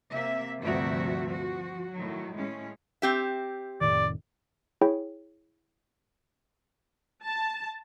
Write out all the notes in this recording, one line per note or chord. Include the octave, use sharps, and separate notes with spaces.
C3 A#3 E5
D2 G2 C3 F3 F#4 E5
F3 F#4
A2 D#3 F#3
A2 G#3 C#4
C4 G4 E5
F1 A2 D#3 D5
E4 G#4 C#5 G5 B5
A5